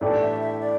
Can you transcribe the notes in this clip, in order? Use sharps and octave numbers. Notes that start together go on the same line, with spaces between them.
A2 E3 A3 D4 G4 D5
E5
E5
D5